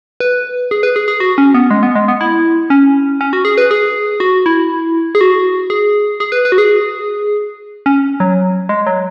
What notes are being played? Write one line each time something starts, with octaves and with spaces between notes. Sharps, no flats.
B4
G#4
B4
G#4
G#4
F#4
C#4
B3
G#3
B3
G#3
B3
E4
C#4
C#4
F#4
G#4
B4
G#4
F#4
E4
G#4
F#4
G#4
G#4
B4
B4
F#4
G#4
C#4
F#3
G#3
F#3